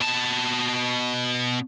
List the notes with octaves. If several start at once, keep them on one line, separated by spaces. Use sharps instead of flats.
B2 A5